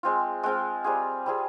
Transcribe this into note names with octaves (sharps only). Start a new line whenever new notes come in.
G#3 C4 F4
G#3 C4 F4
G3 C4 F4 G#4
G3 C4 F4 G#4